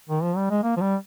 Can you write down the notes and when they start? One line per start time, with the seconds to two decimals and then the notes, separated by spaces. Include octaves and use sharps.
0.09 D#3
0.23 F3
0.37 G3
0.50 G#3
0.64 A#3
0.77 F3
0.81 G3